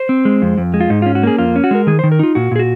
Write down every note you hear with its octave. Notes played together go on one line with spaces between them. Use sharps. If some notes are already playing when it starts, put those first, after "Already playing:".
Already playing: C5
C4
G#3
F2
F2
G#3
F4
G#2 D#4
F4
C#4
F#4
A#3 G#4
F2 F4
C#4
F#4
G#3 A#4
D#3 G#4
C5
D#3
A#4
D#4 F4
A#2 F#4
A#2 G#4
F#4